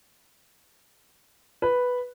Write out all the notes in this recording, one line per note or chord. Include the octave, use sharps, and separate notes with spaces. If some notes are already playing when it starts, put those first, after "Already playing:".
B4